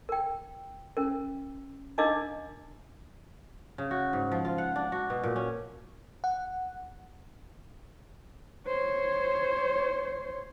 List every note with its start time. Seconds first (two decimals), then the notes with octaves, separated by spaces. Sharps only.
0.09 A#4 G5
0.97 C#4 A#4
1.98 D4 D#4 A#4 D#5 F5 D6
3.78 C#3
3.91 F#4
4.13 G#2
4.32 F3
4.45 F4
4.58 F#5
4.76 D4
4.92 F#4
5.10 B2
5.23 A#2
5.36 C#4
6.24 F#5
8.67 C5 C#5